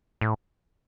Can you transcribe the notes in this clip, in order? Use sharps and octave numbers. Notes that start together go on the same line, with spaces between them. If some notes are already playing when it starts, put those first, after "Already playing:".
A2